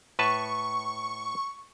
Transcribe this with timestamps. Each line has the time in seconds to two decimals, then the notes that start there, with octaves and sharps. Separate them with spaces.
0.19 A2 B4 A5 C#6